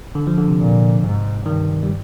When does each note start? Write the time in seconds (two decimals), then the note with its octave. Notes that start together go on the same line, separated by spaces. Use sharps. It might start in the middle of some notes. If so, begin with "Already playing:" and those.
0.15 D3
0.27 F3
0.37 D3
0.48 C3
0.59 A#2
1.03 G#2
1.45 G2 D#3
1.83 G3